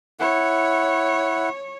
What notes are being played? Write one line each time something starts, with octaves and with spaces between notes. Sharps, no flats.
E4 C#5 F#5